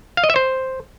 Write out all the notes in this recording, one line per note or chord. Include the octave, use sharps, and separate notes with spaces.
F5
D#5
E5
C5